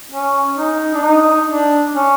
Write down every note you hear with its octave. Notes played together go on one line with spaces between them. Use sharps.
C#4
D#4
D4
D#4
D4
C#4